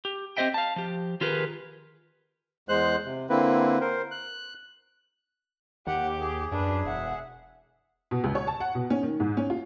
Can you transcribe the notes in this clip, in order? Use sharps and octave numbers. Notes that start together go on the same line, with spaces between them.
G4
C4 G4 C5 D#5 E5 G5
F5 A5
F3 G4
D#3 F4 G4 G#4 A#4 B4
E2 G#3 C5 F#6
C3
D3 A#3 C4 E4 B4
A#4 C5
F#6
D#2 G4 F#5
G#4
F#2 D4 B4
E1 E5 F#5
B2
C#2
C#5
A5
F#5
B2
C#4
D#3
G#2
C#4
F4